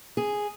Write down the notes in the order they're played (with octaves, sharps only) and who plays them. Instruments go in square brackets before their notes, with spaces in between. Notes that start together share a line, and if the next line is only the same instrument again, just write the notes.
[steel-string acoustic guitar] G#4